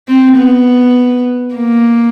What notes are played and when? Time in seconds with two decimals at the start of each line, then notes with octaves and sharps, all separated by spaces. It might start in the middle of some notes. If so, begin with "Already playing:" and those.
0.08 C4
0.37 B3
1.55 A#3